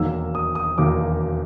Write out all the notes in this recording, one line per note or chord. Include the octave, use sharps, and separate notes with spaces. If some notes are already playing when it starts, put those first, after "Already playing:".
Already playing: E1 D#2 D#3 F#3 A#3 E6
D#6
D#6
E1 D#2 D#3 F#3 A#3 D6